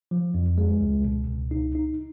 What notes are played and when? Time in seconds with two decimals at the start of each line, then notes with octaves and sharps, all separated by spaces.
0.11 F3
0.34 F2
0.58 G#3
0.81 C#2
1.05 B2
1.27 C#2
1.51 D#4
1.75 D#4